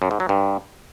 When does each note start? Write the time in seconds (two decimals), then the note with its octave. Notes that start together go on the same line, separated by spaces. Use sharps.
0.02 F#2
0.11 G#2
0.20 F#3
0.29 G2